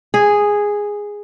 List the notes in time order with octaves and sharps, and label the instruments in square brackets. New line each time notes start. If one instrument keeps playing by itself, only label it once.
[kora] G#4